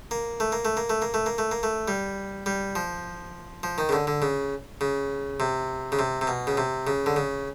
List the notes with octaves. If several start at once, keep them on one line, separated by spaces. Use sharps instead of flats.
A#3
A3
A#3
A3
A#3
A3
A#3
A3
A#3
A3
A#3
A3
G3
G3
F3
F3
D#3
C#3
D3
D3
C#3
C#3
C3
C#3
C3
C3
B2
C#3
C3
C#3
D3
C#3